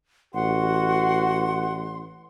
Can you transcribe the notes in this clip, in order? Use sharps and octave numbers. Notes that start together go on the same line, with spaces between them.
A1 F#4 F#5 C6